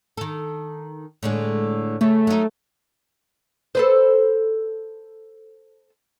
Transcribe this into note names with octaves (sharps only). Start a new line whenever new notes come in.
D#3 A4
A2 D3 G#3
C#3 A3
F#3 D#4
A4 B4 C5